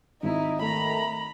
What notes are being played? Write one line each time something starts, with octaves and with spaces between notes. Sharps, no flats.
G#1 D#4 E4
D#3 A3 A#5 B5